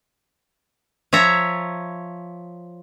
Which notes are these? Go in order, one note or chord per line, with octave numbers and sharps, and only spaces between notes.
F3 C#5 E5 A#5